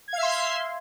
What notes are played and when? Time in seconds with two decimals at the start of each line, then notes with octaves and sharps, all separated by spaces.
0.08 G#6
0.13 F5
0.18 E5
0.23 C6